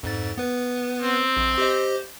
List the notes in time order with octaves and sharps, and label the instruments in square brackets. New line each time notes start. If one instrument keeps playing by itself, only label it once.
[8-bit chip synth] F2 G#2 A6
B3 B4
[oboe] C4
[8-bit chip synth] A#1
G4 C5 D#5